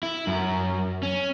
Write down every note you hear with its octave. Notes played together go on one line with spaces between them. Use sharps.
E4
F#2
C#4